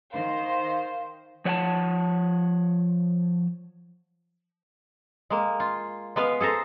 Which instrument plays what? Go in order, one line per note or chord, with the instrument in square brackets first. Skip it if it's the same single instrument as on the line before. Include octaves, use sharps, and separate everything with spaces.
[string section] D#3 C5 [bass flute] F5
[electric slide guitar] F3 C#5 F#5 G5 A5
[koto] G#3 A#3
F4
G#3 B3 B4 F5
G#4 A4 C5 A#5